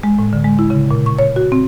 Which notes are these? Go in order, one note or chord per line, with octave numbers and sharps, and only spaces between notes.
G#3
A2
D3
G#3
E4
C#3
A#2
C#6
C#5
F#4
C4